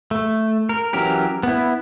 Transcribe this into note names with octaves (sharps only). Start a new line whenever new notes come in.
A3
A#4
E3 F#3 C#4 G4 A#4
B3 E4